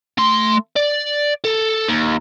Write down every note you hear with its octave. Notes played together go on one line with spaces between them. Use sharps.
A3 C6
D5
A4
D#2